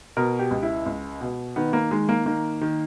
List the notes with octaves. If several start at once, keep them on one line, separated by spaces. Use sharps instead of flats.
B2 A#4
G4
C#2
E4
C#2
B2
D#3 B3
A#3
D#3 G#3
A#3
D#3 A#3
D#3